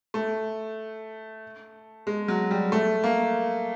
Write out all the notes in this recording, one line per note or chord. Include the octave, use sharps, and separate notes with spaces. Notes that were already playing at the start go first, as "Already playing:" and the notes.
A3
G#3
F#3
G3
A3
A#3